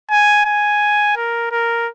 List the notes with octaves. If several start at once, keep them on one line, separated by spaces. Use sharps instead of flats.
G#5
G#5
A#4
A#4